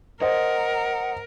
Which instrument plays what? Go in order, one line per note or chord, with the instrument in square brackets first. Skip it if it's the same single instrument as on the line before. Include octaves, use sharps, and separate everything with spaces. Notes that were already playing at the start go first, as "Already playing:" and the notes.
[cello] A#4 [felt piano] C5 D#5 [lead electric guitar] F#5